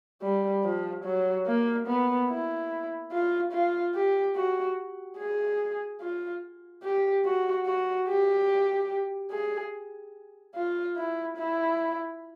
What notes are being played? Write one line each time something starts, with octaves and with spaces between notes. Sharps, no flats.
G3
F3
F#3
A#3
B3
E4
F4
F4
G4
F#4
G#4
F4
G4
F#4
F#4
G4
G#4
F4
E4
E4